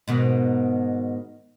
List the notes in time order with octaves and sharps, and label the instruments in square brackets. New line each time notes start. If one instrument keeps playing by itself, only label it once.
[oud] G#2 B2 D#3